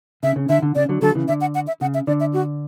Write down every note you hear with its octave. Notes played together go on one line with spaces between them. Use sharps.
C#3 E5
C#3
D3 E5
D3
C#3 D5
D3 F#3
D3 F#3 A4
C#3 E3
D3 E5
F#5
F#5
E5
C#3 F#5
E5
D3 D5
E5
F#4